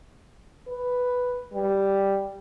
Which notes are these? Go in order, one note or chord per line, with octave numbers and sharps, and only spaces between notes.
B4
G3